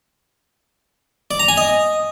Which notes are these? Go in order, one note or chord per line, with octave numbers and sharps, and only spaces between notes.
D5
A#5
G#5
D#5